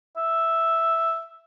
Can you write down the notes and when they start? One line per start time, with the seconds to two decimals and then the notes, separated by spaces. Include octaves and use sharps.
0.17 E5